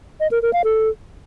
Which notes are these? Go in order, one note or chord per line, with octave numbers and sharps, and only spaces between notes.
D#5
A#4
A#4
F5
A4